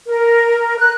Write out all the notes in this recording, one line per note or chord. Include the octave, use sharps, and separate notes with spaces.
A#4
F#6